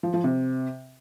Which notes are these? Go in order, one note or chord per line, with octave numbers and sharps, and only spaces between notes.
F3
F3
C3